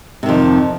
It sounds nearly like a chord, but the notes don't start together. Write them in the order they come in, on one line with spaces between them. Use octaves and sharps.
C3 D#3 F2